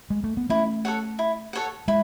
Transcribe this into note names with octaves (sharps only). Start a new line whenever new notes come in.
G#3
A3
B3
A3 C#4 E4
A4 C#5 F#5
E4
A4 C#5 F#5
G#3 E4